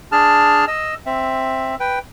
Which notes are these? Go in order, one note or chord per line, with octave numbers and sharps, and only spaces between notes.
D4 G#4 A5 F6
D#5 E6
C4 E5
B4 G5